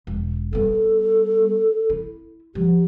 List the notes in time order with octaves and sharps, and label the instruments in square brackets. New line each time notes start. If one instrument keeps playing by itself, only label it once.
[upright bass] E1
[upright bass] G3 B3 [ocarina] A4
[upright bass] E4
[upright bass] F3 [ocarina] G4